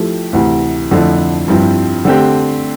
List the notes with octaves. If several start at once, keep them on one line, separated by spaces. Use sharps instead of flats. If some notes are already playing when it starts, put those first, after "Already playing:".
Already playing: F3 A3 E4 G4
D2 C3 E3
F2 D3 F3 A3 E4
G2 F3 C4 E4
D3 A3 C4 G4